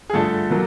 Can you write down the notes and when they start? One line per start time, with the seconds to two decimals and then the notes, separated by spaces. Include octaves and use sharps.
0.10 G#4
0.13 G2 D3 F3 A3 A4
0.50 B2 F#3 A#3